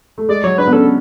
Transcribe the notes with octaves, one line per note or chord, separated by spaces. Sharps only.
A3
G#3 D5
F#3 C#5
D4 B4
B3
C#4 A4